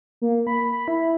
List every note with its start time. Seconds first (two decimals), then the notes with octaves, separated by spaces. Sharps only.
0.22 A#3
0.47 B5
0.88 E4